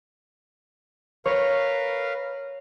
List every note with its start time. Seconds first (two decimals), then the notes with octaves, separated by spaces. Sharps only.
1.25 A#4 B4 C#5 F5